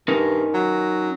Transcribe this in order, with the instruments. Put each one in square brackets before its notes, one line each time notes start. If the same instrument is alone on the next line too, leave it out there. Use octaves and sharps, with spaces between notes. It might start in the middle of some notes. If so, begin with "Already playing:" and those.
[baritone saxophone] G2 [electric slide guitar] C#4 D#4 A#4
[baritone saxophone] F#3